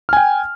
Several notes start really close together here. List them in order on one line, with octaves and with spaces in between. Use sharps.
F6 G#5 G5